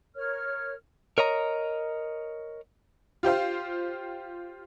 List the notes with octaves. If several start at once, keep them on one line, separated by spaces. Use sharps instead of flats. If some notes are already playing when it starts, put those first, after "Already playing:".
A#4 C#5 F6
A#4 C#5 D#5 A#5
F4 G4 C5 F5